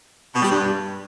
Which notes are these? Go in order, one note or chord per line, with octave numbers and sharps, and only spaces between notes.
B2
G3
G2